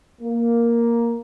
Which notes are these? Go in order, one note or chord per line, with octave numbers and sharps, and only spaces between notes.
A#3